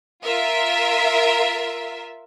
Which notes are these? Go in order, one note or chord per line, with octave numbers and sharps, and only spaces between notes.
F4 A#4 E5